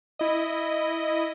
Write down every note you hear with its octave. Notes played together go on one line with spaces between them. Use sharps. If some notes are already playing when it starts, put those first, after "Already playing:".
E4 D#5